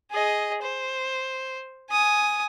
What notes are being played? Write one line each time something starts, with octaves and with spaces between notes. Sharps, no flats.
G#4 D#5
C5
G#5 D#6